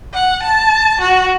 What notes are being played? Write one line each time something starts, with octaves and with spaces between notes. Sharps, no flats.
F#5
A5
F#4